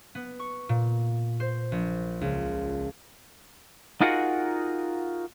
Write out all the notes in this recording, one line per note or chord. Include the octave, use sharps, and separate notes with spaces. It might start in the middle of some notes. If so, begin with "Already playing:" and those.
B3
C#6
A#2
C5
A#1
C#2
D#4 F4 F#4 G#4 A#4 F#5